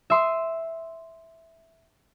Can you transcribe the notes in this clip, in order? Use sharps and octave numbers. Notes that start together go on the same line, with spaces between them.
E5 C6 D#6